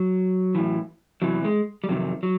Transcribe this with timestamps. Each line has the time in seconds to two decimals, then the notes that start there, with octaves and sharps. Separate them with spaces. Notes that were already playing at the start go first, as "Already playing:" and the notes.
Already playing: F#3
0.55 A2 E3
1.22 E2 C3 E3 F#3
1.44 G#3
1.84 G3
1.89 F2 C3 D#3 F#3
2.23 F#3